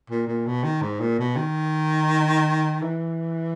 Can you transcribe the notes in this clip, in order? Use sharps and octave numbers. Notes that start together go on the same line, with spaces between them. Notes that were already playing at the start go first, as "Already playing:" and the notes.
A#2
A#2
B2
D#3
G#2
A#2
B2
D#3
E3